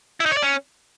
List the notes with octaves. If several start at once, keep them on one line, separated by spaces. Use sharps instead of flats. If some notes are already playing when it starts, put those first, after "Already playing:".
E4
D#4
C#5
D5
C#4